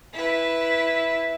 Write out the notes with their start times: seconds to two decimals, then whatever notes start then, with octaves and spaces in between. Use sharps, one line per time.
0.13 E4 B4